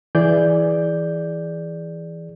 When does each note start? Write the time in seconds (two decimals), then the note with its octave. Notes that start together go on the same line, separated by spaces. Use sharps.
0.15 E3 G#4 D5 G6